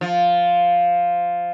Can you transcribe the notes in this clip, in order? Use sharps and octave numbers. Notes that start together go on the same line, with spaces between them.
F3